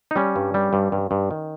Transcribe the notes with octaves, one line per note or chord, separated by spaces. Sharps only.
D#4
G3 C#4
G2
G3
G2
G2
G2
D#3